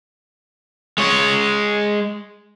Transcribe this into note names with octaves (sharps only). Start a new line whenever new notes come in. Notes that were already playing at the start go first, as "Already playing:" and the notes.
G#3 C#5